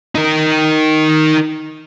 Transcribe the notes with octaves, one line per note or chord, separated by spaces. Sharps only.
D#4 A#4